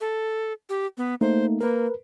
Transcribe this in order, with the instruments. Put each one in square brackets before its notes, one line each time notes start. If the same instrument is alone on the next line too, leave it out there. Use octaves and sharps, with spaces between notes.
[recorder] A4
G4
B3
[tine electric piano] A3 A#3 D#4 [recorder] C5
[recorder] A#3 [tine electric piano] A#4 B4